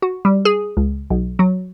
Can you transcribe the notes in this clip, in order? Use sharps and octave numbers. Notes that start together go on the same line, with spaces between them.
F#4
G3
G#4
C#2
B1
F#3